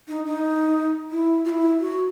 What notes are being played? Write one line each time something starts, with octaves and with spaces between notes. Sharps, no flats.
D#4
D#4
E4
F4
E4
F#4